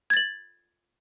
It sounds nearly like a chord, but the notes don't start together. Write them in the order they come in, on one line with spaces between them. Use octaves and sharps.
G#6 A6 F#7